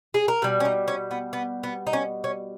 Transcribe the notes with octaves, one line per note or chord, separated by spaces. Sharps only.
G#4
A#4
B2 G3 B4
C#4
D#4
C#4
B3
B3
B3
D#4
C#4
C#4